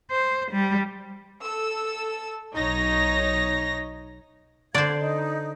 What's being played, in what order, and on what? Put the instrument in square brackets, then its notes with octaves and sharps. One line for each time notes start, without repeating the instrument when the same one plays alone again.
[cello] C5
G3
[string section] A4 E6
B1 D#4 C#5 A#6
[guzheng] D3 C5 [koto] D5 [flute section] F5 G#6
[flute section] D#4